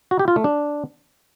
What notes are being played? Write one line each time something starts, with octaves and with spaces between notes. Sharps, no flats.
F#4
G4
F4
A3
D4